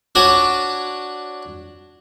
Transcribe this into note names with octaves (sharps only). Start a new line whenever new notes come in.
D4 F#4 C#5 D5